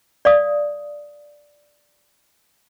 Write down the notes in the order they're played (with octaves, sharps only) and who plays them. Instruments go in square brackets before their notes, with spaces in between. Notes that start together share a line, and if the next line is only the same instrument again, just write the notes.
[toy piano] D5 F5 D#6